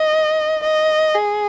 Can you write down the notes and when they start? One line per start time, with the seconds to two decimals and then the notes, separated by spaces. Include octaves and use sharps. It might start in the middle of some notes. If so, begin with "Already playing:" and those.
Already playing: D#5
0.64 D#5
1.14 G#4